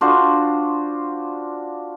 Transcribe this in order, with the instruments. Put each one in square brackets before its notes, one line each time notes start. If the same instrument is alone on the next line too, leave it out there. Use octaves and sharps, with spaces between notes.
[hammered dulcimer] D4 F4 F#4 C5